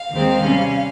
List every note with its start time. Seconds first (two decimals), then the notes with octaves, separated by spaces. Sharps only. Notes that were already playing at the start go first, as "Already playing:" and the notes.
Already playing: F5
0.11 D#2 D#3 G#3 C4
0.43 C3 G3 C#4